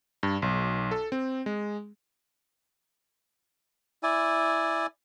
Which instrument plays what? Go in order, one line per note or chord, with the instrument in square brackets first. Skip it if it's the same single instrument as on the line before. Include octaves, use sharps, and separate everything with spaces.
[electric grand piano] G2
B1
A4
C4
G#3
[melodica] E4 D5 G#5